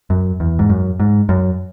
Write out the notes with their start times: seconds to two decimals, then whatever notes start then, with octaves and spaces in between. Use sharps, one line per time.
0.10 F#2
0.40 E2
0.59 G#2
0.69 F#2
1.00 G#2
1.29 F#2